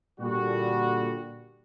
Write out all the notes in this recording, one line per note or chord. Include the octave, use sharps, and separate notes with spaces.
A#2 D3 G3 F#4